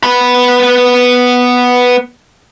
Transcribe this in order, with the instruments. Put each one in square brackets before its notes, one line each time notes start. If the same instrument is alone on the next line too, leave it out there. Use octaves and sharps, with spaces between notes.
[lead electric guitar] B3 B5